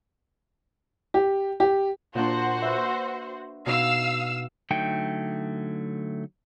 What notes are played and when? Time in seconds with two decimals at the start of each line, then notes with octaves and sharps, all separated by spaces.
1.14 G4
1.60 G4
2.15 A#2 D4 F#4 C5
2.62 B4 E5
3.66 B2 D#4 F5 E6
4.71 D3 F#3 A3 D#4 G5